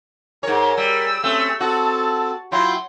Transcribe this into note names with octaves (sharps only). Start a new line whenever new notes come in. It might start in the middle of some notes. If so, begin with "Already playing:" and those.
G#2 A#4 C#5 G#5
G3 E6
A3 C4 C#4
C4 F#4 A4 A5
F#3 E4 F4 G5 C6